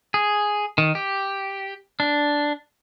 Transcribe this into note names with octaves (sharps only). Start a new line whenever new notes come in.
G#4
D#3
G4
D4